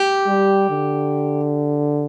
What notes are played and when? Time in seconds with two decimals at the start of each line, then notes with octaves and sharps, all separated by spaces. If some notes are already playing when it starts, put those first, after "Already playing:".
Already playing: G4
0.27 G3
0.70 D3